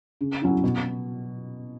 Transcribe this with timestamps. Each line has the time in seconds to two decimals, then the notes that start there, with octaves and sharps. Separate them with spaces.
0.21 C#3
0.42 F#3 C#4 E4
0.64 B2